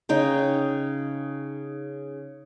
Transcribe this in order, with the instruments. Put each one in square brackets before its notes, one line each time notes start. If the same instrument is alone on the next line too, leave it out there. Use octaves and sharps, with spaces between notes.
[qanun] C#3 D#4 G5